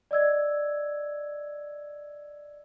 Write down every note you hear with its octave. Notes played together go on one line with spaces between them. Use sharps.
D5 D#5 E6 G#6